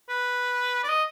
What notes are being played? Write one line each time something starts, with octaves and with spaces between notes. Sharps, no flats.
B4
D5
D#5